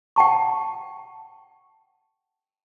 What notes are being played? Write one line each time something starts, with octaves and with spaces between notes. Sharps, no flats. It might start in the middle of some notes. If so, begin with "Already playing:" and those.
F#5 G5 A5 C#6